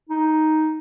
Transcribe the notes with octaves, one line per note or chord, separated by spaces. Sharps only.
D#4